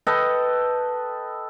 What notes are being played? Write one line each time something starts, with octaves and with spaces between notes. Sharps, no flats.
A4 B4 D#5 G5